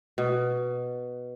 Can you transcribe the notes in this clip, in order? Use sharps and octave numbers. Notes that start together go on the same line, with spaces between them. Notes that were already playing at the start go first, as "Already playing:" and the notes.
B2